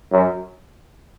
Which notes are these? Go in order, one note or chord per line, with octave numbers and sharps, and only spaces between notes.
F#2